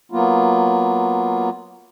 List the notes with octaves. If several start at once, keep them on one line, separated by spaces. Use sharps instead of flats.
F#3 A#3 B3 F4